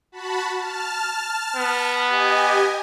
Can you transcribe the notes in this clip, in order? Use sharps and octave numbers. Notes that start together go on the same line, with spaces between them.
F#4 A5 B5
A5 F6
B3
G4 D#5 G#5